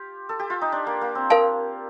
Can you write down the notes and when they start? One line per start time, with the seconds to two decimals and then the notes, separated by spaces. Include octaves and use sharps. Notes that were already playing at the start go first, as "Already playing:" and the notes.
Already playing: F4 G4
0.29 A4
0.39 G4
0.50 F4
0.62 D#4
0.72 D4
0.87 A#3
1.01 A#3
1.15 C4
1.30 A#4 F5 A5